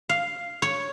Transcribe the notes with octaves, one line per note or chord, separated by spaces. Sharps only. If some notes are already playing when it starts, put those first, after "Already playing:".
F5
C#5